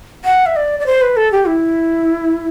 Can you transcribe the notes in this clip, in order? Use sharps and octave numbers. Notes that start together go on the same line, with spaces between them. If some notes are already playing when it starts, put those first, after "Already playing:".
F#5
E5
D5
D5
C5
B4
A4
G4
E4